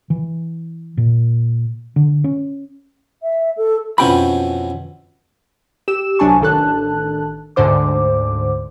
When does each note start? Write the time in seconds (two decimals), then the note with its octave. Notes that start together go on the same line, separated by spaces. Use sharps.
0.10 E3
0.98 A#2
1.96 D3
2.24 C#4
3.22 E5
3.57 A4
3.98 F2 B2 E3 C#4 G5 B5
5.88 G4 E6 E7
6.19 C2 F#3 D4 G#5 A5 C#6
6.41 A1 D#3 D4 A4 A5 F#6
7.56 D2 G#2 D3 C5 D6